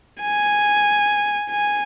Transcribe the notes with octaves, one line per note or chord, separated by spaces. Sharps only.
G#5
G#5